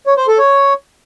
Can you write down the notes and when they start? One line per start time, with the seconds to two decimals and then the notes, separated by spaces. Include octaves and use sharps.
0.07 C#5
0.17 C5
0.28 A4
0.39 C#5